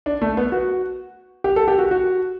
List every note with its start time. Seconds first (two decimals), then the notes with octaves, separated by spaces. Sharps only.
0.06 D4
0.22 A3
0.37 B3
0.52 F#4
1.44 G4
1.56 A4
1.68 G4
1.78 F#4
1.91 F#4